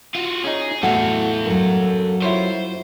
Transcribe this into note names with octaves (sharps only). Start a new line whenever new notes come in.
F4 F#4
C#4 D#4 G#4
E2 A2 E4 F#4 A4 F5
F#2 F#3
E4 F4 C5 C#5